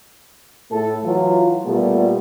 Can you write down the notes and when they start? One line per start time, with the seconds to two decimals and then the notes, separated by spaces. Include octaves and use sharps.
0.70 A2 A3 A4
1.04 E3 F#3 F4
1.64 A#2 G3 A3 B3